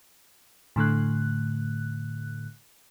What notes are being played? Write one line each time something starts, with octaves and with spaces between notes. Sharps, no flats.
A2 D3 A3 F#6